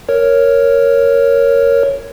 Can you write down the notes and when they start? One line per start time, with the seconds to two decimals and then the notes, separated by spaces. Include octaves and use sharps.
0.09 A#4 C#5